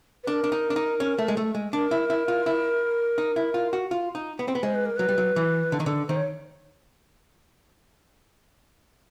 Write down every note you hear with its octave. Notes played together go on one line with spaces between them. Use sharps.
B4
D4 A#4
D4
D#4
D4
D#4
C#4
A3
G#3
A3
G#3
D4 A#4
E4
E4
F4
E4
D#4
E4
F4
F#4
F4
D#4
B3
C4
B3
G#3 C5
B4
A#4
F#3 B4
G3
F#3
E3
D3
D#3
D3
D#3 C5
C#5